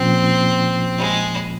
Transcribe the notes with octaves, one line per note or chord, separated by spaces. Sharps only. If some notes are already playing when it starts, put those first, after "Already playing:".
Already playing: A#2 F3 A#3 C4 C#4 F4
G#3